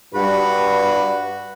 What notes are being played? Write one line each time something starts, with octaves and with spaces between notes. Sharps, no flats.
G2 F#4 B4